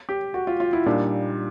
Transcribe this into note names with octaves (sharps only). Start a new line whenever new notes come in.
G4
F#4
F4
F4
E4
A#2 G3 A#3 D4 D#4